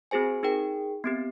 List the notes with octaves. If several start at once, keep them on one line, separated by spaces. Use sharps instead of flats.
C4 F#4 G#4 C5 G#5
D#4 G#4 A#4 G5
B3 C4 G4